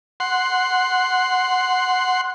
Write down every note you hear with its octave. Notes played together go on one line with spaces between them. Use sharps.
F#5 C6